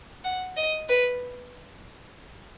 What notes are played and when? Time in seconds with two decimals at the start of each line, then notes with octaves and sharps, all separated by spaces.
0.24 F#5
0.57 D#5
0.89 B4